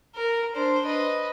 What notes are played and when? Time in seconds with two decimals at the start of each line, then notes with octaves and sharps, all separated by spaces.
0.15 A#4
0.54 D4 C5
0.85 B4 D#5